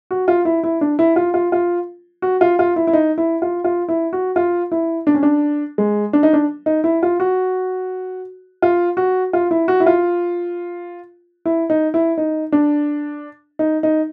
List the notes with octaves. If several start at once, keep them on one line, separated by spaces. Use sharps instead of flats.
F#4
F4
E4
E4
D4
E4
F4
F4
F4
F#4
F4
F4
E4
E4
D#4
E4
F4
F4
E4
F#4
F4
E4
D4
C#4
D4
G#3
D4
D#4
D4
D#4
E4
F4
F#4
F4
F#4
F4
E4
F#4
E4
F4
E4
D#4
E4
D#4
D4
D#4
D#4